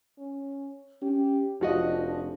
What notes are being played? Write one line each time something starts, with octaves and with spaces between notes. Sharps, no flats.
C#4
C#4 G4
F1 F3 D4 F#4 D#5